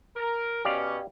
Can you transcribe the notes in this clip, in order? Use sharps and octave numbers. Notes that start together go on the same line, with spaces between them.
A#4
B2 C#4 G4 D5 F5